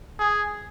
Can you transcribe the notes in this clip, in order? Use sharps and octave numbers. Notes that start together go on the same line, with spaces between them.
G#4